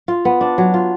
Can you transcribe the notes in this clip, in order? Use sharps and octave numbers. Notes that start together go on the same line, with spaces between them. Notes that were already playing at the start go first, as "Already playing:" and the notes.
F4
B3
D4
F#3
F4